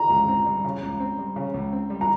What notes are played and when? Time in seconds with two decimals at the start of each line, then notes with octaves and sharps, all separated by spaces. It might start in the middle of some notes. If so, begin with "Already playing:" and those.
Already playing: A#5
0.10 C#2
0.28 C4
0.46 G3
0.65 C#3
0.83 C#2
1.00 C4
1.18 G3
1.36 C#3
1.54 C#2
1.73 C4
1.90 G3
2.01 A#5